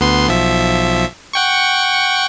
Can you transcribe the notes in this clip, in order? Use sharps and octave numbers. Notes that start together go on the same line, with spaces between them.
D2 B3 C6
B1 F3 E5
F#5 G5 C#6